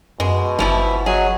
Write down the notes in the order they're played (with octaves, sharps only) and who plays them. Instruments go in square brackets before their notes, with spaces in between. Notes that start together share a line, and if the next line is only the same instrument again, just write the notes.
[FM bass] F#2 [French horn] B2 [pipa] G#3
[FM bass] G1 [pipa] E3 F3 E4
[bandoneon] F#3 [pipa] G#4 [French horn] D#5